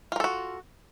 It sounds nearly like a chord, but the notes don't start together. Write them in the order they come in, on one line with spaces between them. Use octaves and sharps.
F4 A#4 A4 F#4